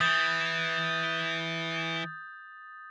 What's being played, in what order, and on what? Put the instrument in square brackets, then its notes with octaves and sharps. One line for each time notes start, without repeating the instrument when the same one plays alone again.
[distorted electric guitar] E3 [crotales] D#6 G6 A6